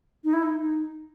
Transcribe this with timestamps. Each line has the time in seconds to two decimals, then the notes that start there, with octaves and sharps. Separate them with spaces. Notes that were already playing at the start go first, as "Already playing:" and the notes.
0.24 D#4
0.33 E4
0.43 D#4
0.60 D#4